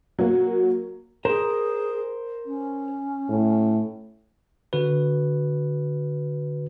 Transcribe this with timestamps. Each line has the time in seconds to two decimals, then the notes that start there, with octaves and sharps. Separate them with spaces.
0.18 F#3 A#3 F#4
1.25 G#4 A#4 C5
2.45 C#4
3.29 A2
4.73 D3 F#4 B4